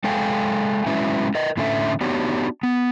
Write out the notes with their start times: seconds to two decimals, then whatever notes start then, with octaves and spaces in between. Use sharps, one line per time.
0.04 G#3 A4 F5 G5 G#5
0.86 F#3 G#3 C#4 E4 B4 E5
1.35 A#4 B4 D#5
1.57 A2 D3 A3 C#4 A4 E5
2.01 B3 D4 D#4 F#4 G4 C#5
2.63 B3